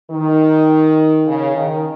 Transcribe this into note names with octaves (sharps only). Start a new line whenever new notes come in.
D#3
C#3
D#3